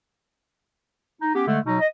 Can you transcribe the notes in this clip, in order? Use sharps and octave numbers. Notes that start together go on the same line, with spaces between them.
D#4
B3 C#4 G4
D3 G#3 A3
B2 F#3 D#4
D#5